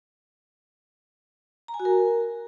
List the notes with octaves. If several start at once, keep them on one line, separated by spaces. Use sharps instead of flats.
A#5
G#5
F#4
A#4